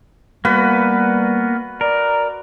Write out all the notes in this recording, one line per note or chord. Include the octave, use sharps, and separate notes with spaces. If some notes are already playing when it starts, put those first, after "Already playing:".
G3 A#3 B3 F#4 B4
A#4 D5